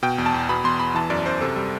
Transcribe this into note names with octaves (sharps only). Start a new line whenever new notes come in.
B2 G5
E2
A5
E2
B2 B5
E2 C6
E2 B5
E3 A5
F#2 D5
F#2 C5
C3 A4
G3